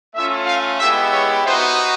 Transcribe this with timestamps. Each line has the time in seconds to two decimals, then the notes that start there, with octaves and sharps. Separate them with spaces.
0.14 A3 C#4 F4 E5
0.46 F5
0.79 G#3 B3 E4 G4 E5
1.13 C#5
1.45 B3 D#4 F#4 C5